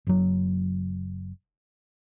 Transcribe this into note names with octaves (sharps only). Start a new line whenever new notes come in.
F#1 F#3